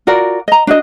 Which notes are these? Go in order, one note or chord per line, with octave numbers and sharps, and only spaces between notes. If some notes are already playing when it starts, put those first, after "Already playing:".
F4 F#4 A#4 D5
D#5 A#5
D4 F#4 D#5